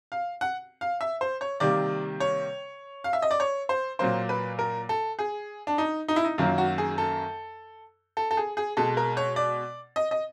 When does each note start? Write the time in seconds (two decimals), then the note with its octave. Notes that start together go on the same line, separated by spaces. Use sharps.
0.12 F5
0.41 F#5
0.81 F5
1.01 E5
1.21 C5
1.41 C#5
1.60 C3 D#3 G3 A#3 D5
2.20 C#5
3.04 F5
3.13 E5
3.22 D#5
3.31 D5
3.40 C#5
3.69 C5
3.99 A#2 F#3 A#3 C5
4.29 B4
4.59 A#4
4.89 A4
5.19 G#4
5.67 D4
5.78 D#4
6.08 D#4
6.16 E4
6.24 D#4
6.38 F#2 D#3 F#3 A#3 F4
6.58 F#4
6.78 G#4
6.98 A4
8.17 A4
8.31 A4
8.37 G#4
8.57 G#4
8.77 B2 G#3 A4
8.97 A#4
9.17 C#5
9.36 D5
9.96 D#5
10.11 D#5